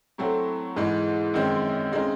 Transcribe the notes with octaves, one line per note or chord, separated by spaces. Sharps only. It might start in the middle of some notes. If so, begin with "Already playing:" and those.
A2 F#3 A3 C4
G#2 E3 G#3
F#2 D#3 G#3 C4
C#3 G#3 C4 D#4